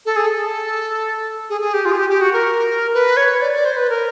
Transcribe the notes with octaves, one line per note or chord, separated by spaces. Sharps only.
A4
G#4
A4
G#4
G#4
G4
F4
G#4
G4
G4
F#4
A#4
B4
C#5
D5
D5
C5
B4
A#4